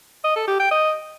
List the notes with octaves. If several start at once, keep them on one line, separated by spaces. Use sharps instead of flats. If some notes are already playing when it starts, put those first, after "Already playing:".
D#5
A4
G4
G5
D#5